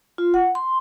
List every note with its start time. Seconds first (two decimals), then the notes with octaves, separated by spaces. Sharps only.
0.18 F4
0.34 F#5
0.55 C6